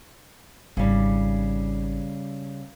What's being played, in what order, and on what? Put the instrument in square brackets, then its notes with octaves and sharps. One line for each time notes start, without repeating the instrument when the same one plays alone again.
[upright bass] G#1 [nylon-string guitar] C#3 G3